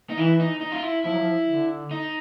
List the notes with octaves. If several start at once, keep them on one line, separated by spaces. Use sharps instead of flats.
D#4
E3 E4
D#4
D#4
F4
E4
F3 E4
F#3
F3
D3
D#4